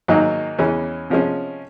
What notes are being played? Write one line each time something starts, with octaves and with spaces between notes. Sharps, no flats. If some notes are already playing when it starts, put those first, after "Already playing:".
G#2 D#3 F#3 A#3 D#4
E2 C#3 E3 G#3 C#4
C3 F3 G#3 C#4